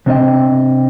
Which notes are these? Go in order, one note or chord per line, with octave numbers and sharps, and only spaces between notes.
C3 C4 D4 A#4 D#5 G5